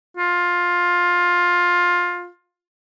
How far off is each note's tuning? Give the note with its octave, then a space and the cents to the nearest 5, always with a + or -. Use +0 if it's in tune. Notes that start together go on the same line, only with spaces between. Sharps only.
F4 +15